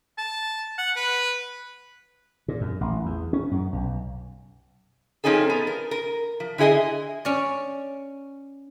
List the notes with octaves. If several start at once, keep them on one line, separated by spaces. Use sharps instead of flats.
A5
F#5
B4
A#2
F#2
A1
E2
C#4
F#2
B1
F3 C4 C#4 D#4 G#4 A4
B3
A#4
A#4
F3
D3 E4 G#4 D#5 G#5
C#4 D5